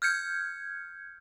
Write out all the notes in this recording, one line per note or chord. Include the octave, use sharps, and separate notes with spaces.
F6 G6 G#6 C#7